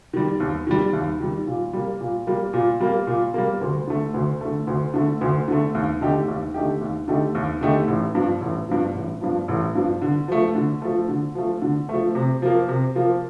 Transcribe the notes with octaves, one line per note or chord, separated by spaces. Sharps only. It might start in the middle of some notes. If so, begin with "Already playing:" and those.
D#3 G3
D#2
D#3 G3
D#2
D#3 G3
A#2
G3 A#3
A#2
G3 A#3
A#2
G3 A#3
A#2
G3 A#3
D2
D3 A3
D2
D3 A3
D2
D3 A3
D2
D3 A3
D#2
D3 A3 D#4 G4
D#2
D3 A3 D#4 G4
D#2
D3 A3 D#4 G4
D#2
D3 A3 D#4 G4
A1
G2 F3
A1
G2 F3
A1
G2 F3
A1
G2 F3
D3
F3 A3
D3
F3 A3
D3
F3 A3
D3
F3 A3
C3
F3 A#3
C3
F3 A#3